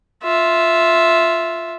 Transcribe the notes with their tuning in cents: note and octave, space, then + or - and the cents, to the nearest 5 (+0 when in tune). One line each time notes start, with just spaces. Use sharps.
F4 +0 E5 +0